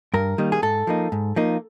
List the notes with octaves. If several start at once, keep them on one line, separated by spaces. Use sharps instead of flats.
G2 A#4
D#3 G3 A#3 D#4
G#4
G#2 A4
F3 A#3 D#4
G#2
F3 A#3 D#4